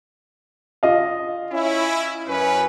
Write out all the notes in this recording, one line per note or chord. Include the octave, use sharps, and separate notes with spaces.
F4 D#5 F5
C#4 E4
F#2 C#4 B4